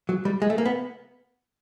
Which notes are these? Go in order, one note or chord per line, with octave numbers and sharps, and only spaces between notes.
F#3
G3
G#3
A3
A#3
B3